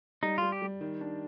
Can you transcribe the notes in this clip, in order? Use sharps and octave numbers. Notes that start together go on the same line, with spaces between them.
G3 D#4
G3 F4
G4
G3
D#3
D4